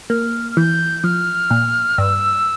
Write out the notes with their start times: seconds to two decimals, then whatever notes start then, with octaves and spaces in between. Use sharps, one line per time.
0.10 A#3 F6
0.52 F6
0.57 E3 G6
1.04 F3 F6
1.50 A#2
1.98 G2 E6